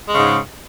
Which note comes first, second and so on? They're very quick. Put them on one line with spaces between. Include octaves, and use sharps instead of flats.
G#3 C#3 G#2